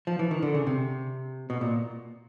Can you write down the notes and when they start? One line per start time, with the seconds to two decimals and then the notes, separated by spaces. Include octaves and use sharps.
0.07 F3
0.19 E3
0.31 D#3
0.42 D3
0.54 C#3
0.67 C3
1.50 B2
1.61 A#2